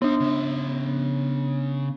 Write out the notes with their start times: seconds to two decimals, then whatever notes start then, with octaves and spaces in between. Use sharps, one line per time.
0.02 B3 D4 D#4 F5
0.20 C#3 E5